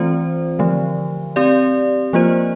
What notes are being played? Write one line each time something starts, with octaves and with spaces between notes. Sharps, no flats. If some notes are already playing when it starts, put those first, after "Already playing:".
Already playing: E3 A3 C4 F4 C5
D3 F3 A3
C4 G4 D5
F3 A#3 F4 C5